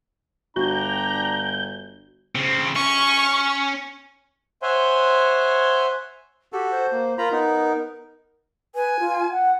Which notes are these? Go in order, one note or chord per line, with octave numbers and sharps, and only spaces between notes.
G1 D4 F#4 G5 A#5 G6
C#3 C4
C#4 C#6
C5 C#5 E5 F#5 G#5 C6
F#4 G4 A4
C5
A#3
F4 A#4 A#5 B5
B3 D#4
B4 G#5
F4
F#5